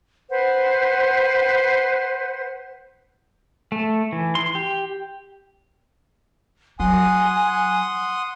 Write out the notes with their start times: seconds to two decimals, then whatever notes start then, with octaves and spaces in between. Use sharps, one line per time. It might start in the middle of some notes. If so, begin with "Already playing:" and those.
0.30 B4 C5 F#5
3.72 A3
4.12 E3
4.35 C6
4.55 G4
6.80 F#3 F#5 G#5 C6 D#6